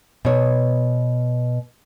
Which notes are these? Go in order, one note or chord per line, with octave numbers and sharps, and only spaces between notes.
B2 C#5